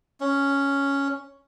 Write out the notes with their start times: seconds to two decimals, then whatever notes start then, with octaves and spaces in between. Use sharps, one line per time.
0.20 C#4